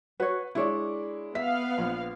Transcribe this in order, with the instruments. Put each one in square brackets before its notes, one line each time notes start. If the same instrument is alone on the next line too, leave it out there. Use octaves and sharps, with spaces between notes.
[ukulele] F#4 C#5 [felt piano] B4
[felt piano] G#3 E4 [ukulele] D4 C#5 D5
[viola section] B3 F5 [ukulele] E5 [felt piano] B6
[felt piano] A#1